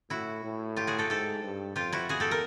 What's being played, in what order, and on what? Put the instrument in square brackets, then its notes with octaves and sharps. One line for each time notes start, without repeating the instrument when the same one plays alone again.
[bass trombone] A2 [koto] E4 F#4
[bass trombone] A2
[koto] F4 G4
F#4 G#4
G4 A4
[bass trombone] G#2 [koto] G4 A4
[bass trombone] G2
[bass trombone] F2 [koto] F4 G4
[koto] E4 F#4
[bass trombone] E2 [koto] F#4 G#4
[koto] G4 A4
A#4